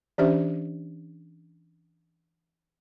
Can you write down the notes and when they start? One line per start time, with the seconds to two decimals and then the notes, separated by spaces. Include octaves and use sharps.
0.18 E3 C#4 D4 G4 C5 E5